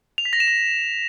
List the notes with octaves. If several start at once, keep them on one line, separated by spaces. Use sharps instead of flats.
F7
B6
A#6
E7
A#6